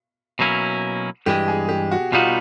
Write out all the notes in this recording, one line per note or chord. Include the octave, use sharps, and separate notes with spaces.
B2 F#3 A#3 C#4 E4
G2 E3 G#3 G4
G#4
G4
F#4
B2 G3 B3 D#4 F4 F#4